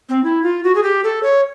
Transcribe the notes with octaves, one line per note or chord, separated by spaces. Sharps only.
C4
E4
F4
F#4
G#4
G4
A4
C#5